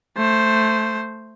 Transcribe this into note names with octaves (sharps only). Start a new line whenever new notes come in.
A3 C5